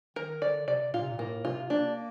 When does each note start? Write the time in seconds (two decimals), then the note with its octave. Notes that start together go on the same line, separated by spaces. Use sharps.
0.16 D#3 A#4
0.41 D3 D5
0.67 C3 D5
0.93 A#2 F4
1.02 C3
1.10 A#2
1.19 A2 A#3
1.44 C3 F4
1.70 A#3 D4